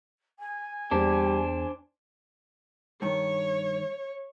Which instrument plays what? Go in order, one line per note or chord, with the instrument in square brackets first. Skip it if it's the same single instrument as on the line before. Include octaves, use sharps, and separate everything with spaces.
[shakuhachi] G#5
[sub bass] E2 [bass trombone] G3 [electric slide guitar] D4 C5
[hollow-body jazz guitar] G2 D#3 [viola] C#5